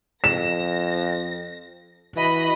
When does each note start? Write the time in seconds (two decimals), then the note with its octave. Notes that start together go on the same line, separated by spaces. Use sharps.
0.24 F2 A#6 E7
2.16 E3 F#4 D#5 B5